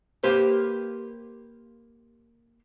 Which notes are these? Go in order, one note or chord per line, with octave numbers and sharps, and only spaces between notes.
A#3 G4 B4 C5